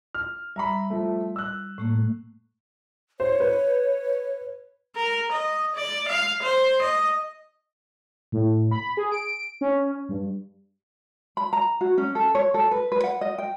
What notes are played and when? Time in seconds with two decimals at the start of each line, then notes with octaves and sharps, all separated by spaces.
0.14 F6
0.56 G3 E5 A#5 B5
0.90 F3 A3
1.36 E6 F#6
1.78 A2 A3 A#3
3.20 C5 C#5
3.40 B4
4.96 A#4
5.32 D#5
5.76 D5
6.08 F5
6.43 C5
6.82 D#5
8.32 A2
8.71 B5
8.97 G#4
9.12 D7
9.61 C#4
10.09 G2
11.37 B5
11.53 A#5
11.81 F#4
11.98 C#4
12.15 A4
12.35 C#5
12.54 A4
12.71 B4
12.92 B4
13.04 F#5
13.21 D#5
13.38 G5